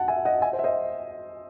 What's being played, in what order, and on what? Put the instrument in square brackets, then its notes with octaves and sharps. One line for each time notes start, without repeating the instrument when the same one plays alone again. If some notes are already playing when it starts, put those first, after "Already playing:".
Already playing: [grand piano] F#5 A5
E5 G#5
D#5 F#5
E5 G#5
C5
E5
C5 D#5